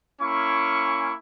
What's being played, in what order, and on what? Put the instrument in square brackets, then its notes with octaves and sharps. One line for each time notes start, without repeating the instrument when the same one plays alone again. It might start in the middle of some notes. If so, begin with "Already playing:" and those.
[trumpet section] A#3 C#4 E4 G#5 C#6